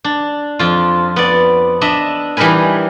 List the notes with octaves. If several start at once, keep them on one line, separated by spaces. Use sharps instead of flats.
D4
F2 F4
B3 D5
D4 D#5 E5
E3 G3 D#4 A#4 B4 G#5